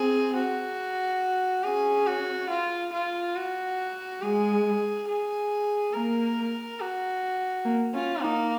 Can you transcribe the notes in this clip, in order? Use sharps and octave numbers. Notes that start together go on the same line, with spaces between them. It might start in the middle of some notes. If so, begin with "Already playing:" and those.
Already playing: C4 G#4
F#4
C#4 G#4
F#4
F4
F4
F#4
G#3 G#4
G#4
A#3 A#4
F#4
A#3
C#4 F4
A#3 D#4